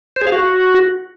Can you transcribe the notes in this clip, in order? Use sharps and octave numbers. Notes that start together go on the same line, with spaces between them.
C5
G#4
F5
F#4